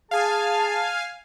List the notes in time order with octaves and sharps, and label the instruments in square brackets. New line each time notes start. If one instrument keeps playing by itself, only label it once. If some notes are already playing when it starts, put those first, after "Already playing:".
[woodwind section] G#4 A5 [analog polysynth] F5 G#5